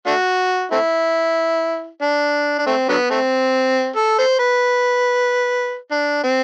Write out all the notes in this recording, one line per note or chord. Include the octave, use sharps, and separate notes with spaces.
A3 D4 F#4
A3 C4 E4
D4
D4
A3 C4
D3 F#3 B3
A3 C4
A4
A4 C5
B4
D4
C4